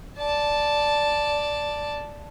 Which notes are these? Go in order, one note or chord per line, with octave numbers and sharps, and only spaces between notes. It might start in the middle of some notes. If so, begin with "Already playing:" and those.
D5 A5